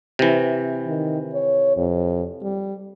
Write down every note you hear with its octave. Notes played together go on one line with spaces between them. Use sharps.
C3 E3
D#3
C#5
F2
G3